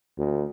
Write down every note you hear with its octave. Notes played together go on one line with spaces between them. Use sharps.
D2